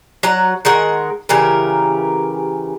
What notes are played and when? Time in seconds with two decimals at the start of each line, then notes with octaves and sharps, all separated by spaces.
0.23 F#3 F#5 A#5
0.65 D#3 G#3 A#4 F#5
1.29 C#3 E3 G4 A#4